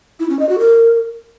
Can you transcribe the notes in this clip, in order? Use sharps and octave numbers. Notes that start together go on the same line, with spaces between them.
E4
C#4
D#5
F#4
A#4